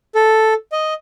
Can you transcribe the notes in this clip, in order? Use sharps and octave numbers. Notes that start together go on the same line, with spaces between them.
A4
D#5